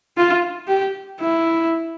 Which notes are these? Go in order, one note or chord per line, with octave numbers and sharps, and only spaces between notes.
F4
G4
E4